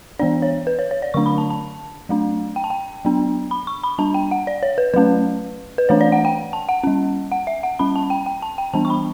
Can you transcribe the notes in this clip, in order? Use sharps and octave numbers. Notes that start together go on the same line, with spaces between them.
E3 B3 D4 D5
C#5
B4
C#5
C#5
D5
D3 F#3 A3 D4 C#6
B5
A5
A5
F#3 A3 D4
G5
A5
G5
F#3 B3 D4
B5
C#6
B5
G3 D4 A5
G5
F#5
D5
C#5
B4
F#3 A3 C#4 B4
B4
E3 A3 D4 C#5
D5
F#5
G5
A5
F#5
G3 C#4
F#5
E5
F#5
G3 C#4 B5
A5
G5
G5
A5
G5
E3 G3 B3 D4 A5
C#6
B5